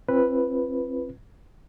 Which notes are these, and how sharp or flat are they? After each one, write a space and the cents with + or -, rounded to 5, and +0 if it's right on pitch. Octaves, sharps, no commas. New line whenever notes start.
C4 +25 F4 -35 B4 +0